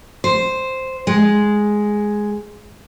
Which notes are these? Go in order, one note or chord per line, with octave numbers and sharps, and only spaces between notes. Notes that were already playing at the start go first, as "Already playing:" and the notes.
C5
G#3